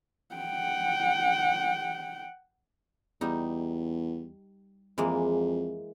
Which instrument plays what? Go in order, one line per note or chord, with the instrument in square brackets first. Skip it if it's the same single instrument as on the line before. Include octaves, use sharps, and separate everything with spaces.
[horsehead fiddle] F#5 G5
[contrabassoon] E2 [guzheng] G3 D#4
[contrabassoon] F2 [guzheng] E3 G#3 A#3